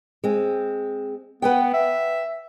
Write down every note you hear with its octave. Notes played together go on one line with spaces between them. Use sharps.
G#3 C4
B3 B4 F#5 G5
E5